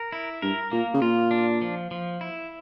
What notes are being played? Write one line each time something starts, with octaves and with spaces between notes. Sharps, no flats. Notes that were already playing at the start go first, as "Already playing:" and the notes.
Already playing: A#4
E4
G2 A#4
A#2 A#3
C#3
A#2 F4
D4
F3
F3
E4